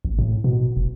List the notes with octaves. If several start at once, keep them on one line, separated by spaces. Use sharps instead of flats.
A1
A2
B2
F1